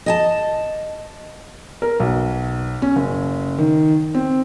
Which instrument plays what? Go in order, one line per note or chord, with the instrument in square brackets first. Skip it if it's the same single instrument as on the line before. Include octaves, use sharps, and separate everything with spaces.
[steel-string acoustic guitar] D#5 G#5 A5
[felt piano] A#4
B1
C#4
F#1
D#3
C4